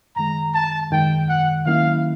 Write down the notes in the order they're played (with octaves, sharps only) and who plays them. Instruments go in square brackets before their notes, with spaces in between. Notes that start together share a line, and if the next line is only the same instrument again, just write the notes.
[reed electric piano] F#2 D#3 G#3 [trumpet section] A#5
[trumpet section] A5
[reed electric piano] F#2 D#3 G#3 [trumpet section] G5
[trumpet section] F#5
[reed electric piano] D#3 F#3 A#3 C#4 E4 [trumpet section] F5